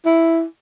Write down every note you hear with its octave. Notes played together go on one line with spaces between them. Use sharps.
E4